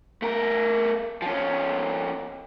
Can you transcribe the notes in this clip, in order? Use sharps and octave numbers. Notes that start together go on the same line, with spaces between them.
A3 A#4
F3 C#4